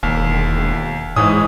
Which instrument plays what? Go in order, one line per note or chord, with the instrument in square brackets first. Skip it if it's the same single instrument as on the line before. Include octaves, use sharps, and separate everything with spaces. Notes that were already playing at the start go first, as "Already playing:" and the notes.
[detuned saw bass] E1 [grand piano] D#2
[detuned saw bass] G#2 [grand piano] E3 C#5 D#6